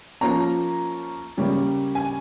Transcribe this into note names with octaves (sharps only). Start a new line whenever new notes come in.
F3 A#3 C#4 A#5
C#3 G3 A#3 C#4
G#5